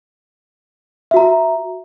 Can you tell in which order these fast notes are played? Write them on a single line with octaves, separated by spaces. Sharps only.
E5 F#4 A#5